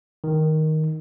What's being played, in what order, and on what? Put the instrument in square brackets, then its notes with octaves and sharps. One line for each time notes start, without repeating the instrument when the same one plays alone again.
[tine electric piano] D#3